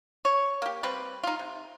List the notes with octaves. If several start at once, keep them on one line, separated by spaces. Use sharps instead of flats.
C#5
A#3 G4
G3 C4 G4 B4
D#4 F4
C3